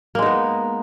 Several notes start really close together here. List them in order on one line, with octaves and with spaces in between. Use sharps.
A#3 G#3 D#4 B3